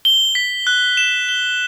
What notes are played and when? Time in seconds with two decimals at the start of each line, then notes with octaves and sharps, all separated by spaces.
0.05 G7
0.35 B6
0.67 F#6
0.97 E7
1.29 G7